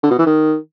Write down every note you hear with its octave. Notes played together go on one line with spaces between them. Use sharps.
D3
B2
E3
D#3